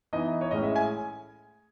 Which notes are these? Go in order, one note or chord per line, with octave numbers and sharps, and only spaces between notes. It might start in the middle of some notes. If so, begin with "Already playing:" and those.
E3 B3 D#4 D#5
C#5
A2 G#3 C#4 D#5
E5
G#5